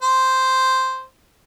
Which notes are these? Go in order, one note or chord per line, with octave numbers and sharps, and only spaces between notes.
C5